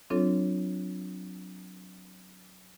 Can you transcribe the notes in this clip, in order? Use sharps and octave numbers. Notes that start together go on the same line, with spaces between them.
F#3 C4 D4 F4 A4 C#5